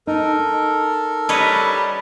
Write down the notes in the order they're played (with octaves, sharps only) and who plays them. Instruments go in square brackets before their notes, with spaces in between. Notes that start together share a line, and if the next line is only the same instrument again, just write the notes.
[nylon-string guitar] D#4 [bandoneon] A4 A#4
[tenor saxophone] G3 [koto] B4 C#5 D#5